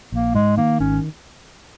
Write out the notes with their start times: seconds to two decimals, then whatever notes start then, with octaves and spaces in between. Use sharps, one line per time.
0.12 A#1 A#3
0.34 G#2 G#3
0.58 D#3 A#3
0.80 G#1 C#4